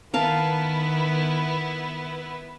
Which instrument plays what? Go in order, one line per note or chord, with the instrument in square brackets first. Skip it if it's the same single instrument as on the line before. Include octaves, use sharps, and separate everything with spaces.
[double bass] D#3 [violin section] B3 E4 B4 [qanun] A#4 F5 A5